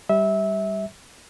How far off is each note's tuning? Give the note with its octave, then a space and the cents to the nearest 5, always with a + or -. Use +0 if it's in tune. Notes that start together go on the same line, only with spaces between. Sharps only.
G3 +0 E5 -20